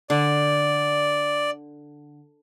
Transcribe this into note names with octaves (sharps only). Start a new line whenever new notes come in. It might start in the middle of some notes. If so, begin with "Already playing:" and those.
D3 D5